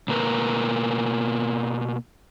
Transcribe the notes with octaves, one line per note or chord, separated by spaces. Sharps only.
B2 A#3 A#4 B4